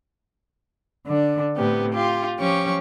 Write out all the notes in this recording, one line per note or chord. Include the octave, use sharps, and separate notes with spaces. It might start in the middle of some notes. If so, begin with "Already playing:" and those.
D3 D4
A2 C3 B3 G4
F4 G4
F3 C#4 G4 C#6